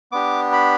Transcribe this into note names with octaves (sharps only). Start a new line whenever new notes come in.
B3 D4 G4 D6
B5